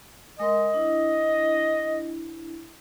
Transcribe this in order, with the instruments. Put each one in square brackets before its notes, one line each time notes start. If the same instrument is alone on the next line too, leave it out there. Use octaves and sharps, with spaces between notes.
[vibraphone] G#3 A#4 C6 [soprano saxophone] D#5
[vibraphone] D4 E4